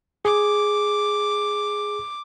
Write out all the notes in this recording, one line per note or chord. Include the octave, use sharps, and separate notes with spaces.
G#4 D6